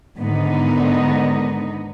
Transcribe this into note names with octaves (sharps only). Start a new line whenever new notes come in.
G#2 D3 D#3 B3 D#4